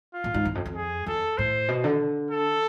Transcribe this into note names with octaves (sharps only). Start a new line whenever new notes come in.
F4
A2
G#2
E2
F2
F2
G#4
F2 A4
A2 C5
B2
D3
A4